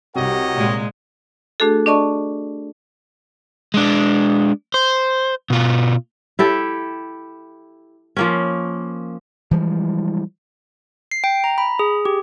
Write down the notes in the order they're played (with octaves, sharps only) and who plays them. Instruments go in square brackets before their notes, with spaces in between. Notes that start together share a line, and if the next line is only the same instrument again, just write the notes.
[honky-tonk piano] C2 C3 [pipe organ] F#4 G4 [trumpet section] A#4 C#5 D#5
[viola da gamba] A#2 G#3
[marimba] A3 D4 F#4 G#4 A4
D4 D5 D#5 A5 C#6
[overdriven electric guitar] G#3 D4
C5
B2 F4
[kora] E4 G4 A4
F3 A#3 C#4
[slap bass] E3 F3 G3 G#3
[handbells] C7
G5
A#5
B5
G#4
G4